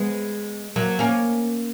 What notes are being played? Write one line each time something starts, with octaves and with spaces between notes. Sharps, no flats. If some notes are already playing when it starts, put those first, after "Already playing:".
Already playing: G#3 B3
F#3 A#3
A#3 C#4